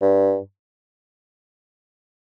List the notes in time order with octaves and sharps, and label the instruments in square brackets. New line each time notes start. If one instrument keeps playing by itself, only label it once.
[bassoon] G2